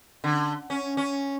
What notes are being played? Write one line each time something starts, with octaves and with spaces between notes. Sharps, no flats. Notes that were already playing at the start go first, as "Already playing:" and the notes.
D3
C#4
C#4